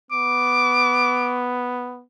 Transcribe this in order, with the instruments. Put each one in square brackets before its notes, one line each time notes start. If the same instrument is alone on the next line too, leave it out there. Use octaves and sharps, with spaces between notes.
[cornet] B3 [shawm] D6